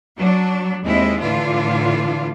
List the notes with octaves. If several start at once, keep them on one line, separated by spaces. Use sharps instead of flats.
F#3 D4
D#2 G#3 C4 E4 D#5
A2 D3 E3 D4 F4